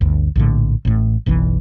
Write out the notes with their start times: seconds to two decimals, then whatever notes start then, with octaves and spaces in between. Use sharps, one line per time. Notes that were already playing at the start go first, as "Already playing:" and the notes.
0.01 G1 D2
0.36 A#1 A2 D3
0.85 A1 A2
1.26 F#1 B1 B2 E3